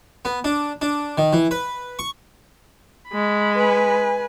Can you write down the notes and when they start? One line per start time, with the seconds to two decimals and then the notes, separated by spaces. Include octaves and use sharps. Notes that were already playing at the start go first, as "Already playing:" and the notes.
0.25 B3
0.44 D4
0.82 D4
1.18 D#3
1.33 E3
1.51 B4
1.99 C#6
3.09 G#3 B5
3.55 B4 G#5